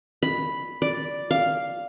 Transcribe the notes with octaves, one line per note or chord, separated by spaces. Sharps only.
B5
D5
F5